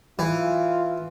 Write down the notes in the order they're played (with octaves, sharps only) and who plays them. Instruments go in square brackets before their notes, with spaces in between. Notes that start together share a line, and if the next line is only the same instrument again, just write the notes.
[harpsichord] E3 [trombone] F4